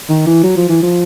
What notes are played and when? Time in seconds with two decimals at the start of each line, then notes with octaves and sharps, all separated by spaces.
0.09 D#3
0.27 E3
0.43 F#3
0.57 F3
0.69 E3
0.83 F3